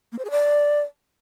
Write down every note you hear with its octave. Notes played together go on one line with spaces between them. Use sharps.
A#3
C5
G#4
D5